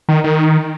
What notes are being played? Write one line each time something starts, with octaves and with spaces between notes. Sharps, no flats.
D#3
D#3